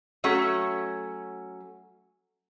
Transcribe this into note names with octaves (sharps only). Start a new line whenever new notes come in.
F#3 A3 C#4 F#4